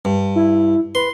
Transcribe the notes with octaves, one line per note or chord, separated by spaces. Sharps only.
G2
E4
B4 C6